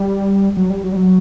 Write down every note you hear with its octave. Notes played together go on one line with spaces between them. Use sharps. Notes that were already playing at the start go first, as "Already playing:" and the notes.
Already playing: G3
F#3
G3
F#3
G3
F#3